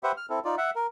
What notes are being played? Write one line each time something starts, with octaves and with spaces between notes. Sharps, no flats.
G4 B4 C5 E5 F#5
F6
C4 E4 A4
D#4 F4 D5
E5 F#5
A#4